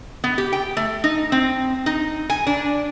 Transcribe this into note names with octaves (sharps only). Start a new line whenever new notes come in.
B3
G4
G5
A3
D#4
C4
D#4
G#5
D4